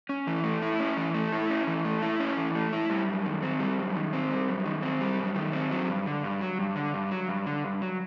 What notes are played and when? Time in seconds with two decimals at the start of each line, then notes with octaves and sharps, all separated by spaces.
0.09 C#4
0.27 E3
0.44 A3
0.62 E4
0.80 C#4
0.97 E3
1.14 A3
1.32 E4
1.50 C#4
1.67 E3
1.85 A3
2.02 E4
2.20 C#4
2.37 E3
2.55 A3
2.73 E4
2.90 G3
3.08 F#2
3.26 D#3
3.43 C4
3.60 G3
3.78 F#2
3.96 D#3
4.13 C4
4.30 G3
4.49 F#2
4.66 D#3
4.83 C4
5.01 G3
5.19 F#2
5.36 D#3
5.53 C4
5.71 F#3
5.88 G2
6.06 D3
6.24 G2
6.41 F#3
6.59 G2
6.76 D3
6.94 G2
7.11 F#3
7.29 G2
7.46 D3
7.64 G2
7.81 F#3